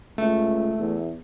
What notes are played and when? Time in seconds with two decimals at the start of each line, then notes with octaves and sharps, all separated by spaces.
0.18 C#2 A3
0.79 E2